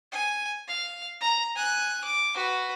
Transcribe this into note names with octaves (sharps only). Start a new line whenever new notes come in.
G#5
F5
A#5
G#5 F#6
D6
F#4 B4